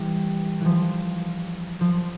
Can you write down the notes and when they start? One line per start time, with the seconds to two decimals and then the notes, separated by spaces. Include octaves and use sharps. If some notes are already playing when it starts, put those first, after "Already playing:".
Already playing: E3 G3
0.61 E3 F3
1.81 F3